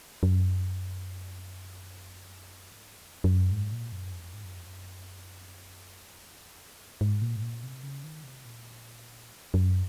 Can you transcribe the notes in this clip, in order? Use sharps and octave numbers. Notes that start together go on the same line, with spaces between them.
F#2
G#2
F2
F#2
G#2
A#2
F#2
F2
G#2
F#2
F2
F#2
F2
F#2
A#2
G#2
A#2
G#2
A#2
C3
C#3
D#3
C3
A#2
F#2